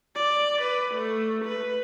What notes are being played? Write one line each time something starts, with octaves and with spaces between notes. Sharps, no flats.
D5
B4
A3
B4